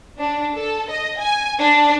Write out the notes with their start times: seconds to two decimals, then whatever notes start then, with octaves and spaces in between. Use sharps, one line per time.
0.19 D4
0.54 A4
0.90 D#5
1.19 G#5
1.60 D4